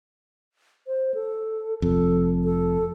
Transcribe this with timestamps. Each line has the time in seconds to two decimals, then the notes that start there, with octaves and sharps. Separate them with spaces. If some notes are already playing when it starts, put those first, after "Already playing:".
0.87 C5
1.14 A4
1.82 F1 F2 A4
2.44 A4